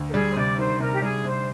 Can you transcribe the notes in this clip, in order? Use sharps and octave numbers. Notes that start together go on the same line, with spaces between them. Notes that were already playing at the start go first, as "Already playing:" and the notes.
Already playing: D2
A#4
G3 G#4
C5
C3 D5
D#3 C5
C3 A#4
G4
G3 G#4
C3 C5